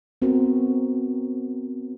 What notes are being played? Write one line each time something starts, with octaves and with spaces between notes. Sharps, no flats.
B3 C4 F#4 A#4